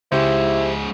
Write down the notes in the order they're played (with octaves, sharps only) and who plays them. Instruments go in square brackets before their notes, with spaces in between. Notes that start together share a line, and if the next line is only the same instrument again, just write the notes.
[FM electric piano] C#2 [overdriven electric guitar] G#2 C#3 [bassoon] E4 [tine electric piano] G4 C5